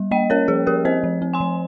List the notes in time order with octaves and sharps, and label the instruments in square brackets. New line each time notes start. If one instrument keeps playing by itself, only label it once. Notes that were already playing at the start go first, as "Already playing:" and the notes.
Already playing: [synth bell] G3
A#3 D#5 G5
C#4 A#4 C#5
F3 G#4
F3 G4 A#4
C4 C5 D#5
F3
C4
G#5 C6
F3